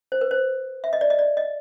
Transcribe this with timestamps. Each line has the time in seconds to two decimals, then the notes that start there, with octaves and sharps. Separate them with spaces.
0.12 C5
0.21 B4
0.31 C5
0.84 E5
0.93 D#5
1.01 D5
1.10 D#5
1.19 D5
1.37 D#5